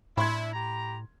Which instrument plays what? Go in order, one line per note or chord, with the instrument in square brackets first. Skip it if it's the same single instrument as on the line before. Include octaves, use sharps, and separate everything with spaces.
[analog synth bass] A2 [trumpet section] D4 E4 [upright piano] B5 C6 G#6
[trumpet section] G4 A#5